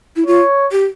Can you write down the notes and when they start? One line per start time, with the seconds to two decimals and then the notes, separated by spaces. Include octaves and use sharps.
0.16 E4
0.26 F4 C#5
0.72 G4